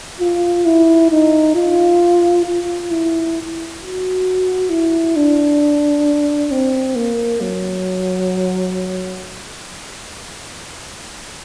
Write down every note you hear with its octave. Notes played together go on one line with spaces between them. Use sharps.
F4
E4
D#4
F4
F4
E4
F#4
E4
D4
C4
A#3
F#3